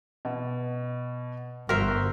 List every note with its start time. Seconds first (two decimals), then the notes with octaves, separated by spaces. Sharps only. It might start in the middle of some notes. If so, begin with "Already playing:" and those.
0.25 B2
1.69 G1 F#4 A#4 C5 E5 F#5